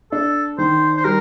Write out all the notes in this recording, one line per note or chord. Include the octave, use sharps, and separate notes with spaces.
D4 A4
D#3 C5
C5
G3 A#4